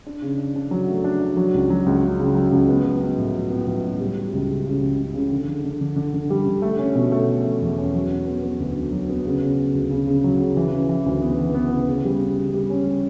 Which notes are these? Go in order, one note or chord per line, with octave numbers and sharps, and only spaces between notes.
D4
C#3
D4
D4
F#3
A3
D4
D4
F#3
C#2
F#3
C#2
C#3
C#3
F#3
C#2
B3
F#3
B3
A2
F#3
B3
A2
F#3
G3
G3
C#2
C#3
C#3
C#2
C#3
C#3
D3
D3
D3
D3
D3
D3
G3
D3
A3
C#4
B2
A3
A3
A3
E2
C#4
F#3
B3
B3
B3
D2
D3
F#3
B3
C#3
C#3
C#3
D2
C#3
C#3
F#3
C#3
E3
C#3
E3
D2
B3
E3
B3
C#3
C#3
G3
C#3
C#3
G3
C#4
G3